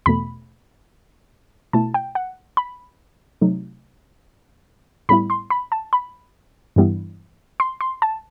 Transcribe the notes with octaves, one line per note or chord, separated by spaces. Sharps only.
E2 B2 A3 B5
B2 A3 E4 A5
G5
F#5
B5
C3 F#3 A3 D#4
A2 G3 B3 E4 B5
C6
B5
A5
B5
G2 E3 G3 B3 E4
C6
C6
A5